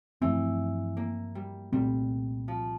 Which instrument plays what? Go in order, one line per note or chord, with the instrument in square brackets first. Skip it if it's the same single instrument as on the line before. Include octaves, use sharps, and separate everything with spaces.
[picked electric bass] G2 F3 A3 C4 [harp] E3
[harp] A#3
G3
[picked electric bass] C2 A#2 A3 C4 [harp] G3
[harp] F3